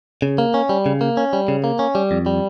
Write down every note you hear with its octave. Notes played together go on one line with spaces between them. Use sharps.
C#3
A#3
C#4
G3
C#3
A#3
C#4
G3
C#3
A#3
C#4
G3
F2
G3